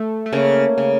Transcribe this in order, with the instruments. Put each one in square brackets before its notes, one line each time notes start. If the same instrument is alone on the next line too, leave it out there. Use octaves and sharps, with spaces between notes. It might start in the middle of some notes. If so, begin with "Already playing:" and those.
Already playing: [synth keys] A3
A3
[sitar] C#3 [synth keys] A#3
[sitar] C#3